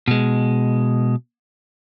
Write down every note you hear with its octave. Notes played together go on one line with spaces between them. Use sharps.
B2 G#3